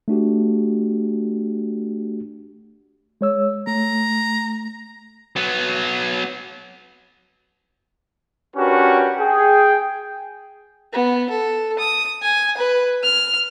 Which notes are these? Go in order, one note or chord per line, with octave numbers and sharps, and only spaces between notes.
A3 D4 F#4 G4
G#3 C#5 E6
A3 A#5
F#3 B3
C#4 D4 F#4 G4 A#4 B4
G#4 G5
B3
A4
D#6
G#5
B4
F6